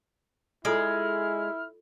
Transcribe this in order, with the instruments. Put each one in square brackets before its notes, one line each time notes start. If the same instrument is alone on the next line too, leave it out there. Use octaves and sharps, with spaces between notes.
[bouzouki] G#3 [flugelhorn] E4 [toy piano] F4 A4 D#6 [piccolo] F6